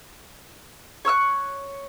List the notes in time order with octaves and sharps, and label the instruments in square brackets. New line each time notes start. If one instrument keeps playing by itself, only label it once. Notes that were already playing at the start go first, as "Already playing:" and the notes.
[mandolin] C#5 C#6 E6 F#6